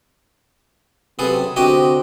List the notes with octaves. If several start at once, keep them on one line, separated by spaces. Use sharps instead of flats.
F#2 C3 B3 G#4 A4
D3 C4 F#4 G4 D#5